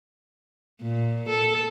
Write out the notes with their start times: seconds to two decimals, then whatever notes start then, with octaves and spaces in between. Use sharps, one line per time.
0.82 A#2
1.29 A4